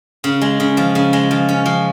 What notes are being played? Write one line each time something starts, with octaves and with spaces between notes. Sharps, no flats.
C#3
G#3
C#3
F3
C#3
G#3
F3
C#4
F3